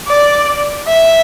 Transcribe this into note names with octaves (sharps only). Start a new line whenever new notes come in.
D5
E5